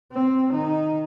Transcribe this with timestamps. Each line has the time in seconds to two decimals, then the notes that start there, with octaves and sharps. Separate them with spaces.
0.12 C4
0.52 D#3 D#4